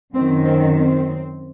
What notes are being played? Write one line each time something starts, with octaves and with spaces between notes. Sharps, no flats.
F#2 D#3 C4
C4
C4